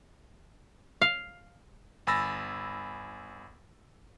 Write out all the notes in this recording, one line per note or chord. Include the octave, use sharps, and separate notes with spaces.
F5
G1 G#5 B5 E6 A6 A#6